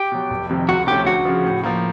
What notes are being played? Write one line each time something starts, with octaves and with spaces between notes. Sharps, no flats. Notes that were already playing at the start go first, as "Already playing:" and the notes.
Already playing: G4
B2 F#3
F1
F2 C3 D#3
C#2 F#4
C3 F3 A3 C#4 G4
D2 F#4
C#3 F3
A2
F3 A#3